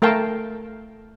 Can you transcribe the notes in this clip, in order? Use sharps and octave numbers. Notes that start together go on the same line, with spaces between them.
A3 A#4 F5 G5 A5